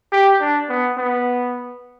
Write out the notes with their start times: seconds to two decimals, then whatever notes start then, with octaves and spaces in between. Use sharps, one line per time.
0.12 G4
0.41 D4
0.69 B3
0.97 B3